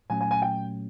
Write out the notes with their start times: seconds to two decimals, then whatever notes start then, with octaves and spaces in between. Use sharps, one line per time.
0.10 A#2 F#3 A3 C#4 G#5
0.21 G#5
0.31 G#5
0.42 G5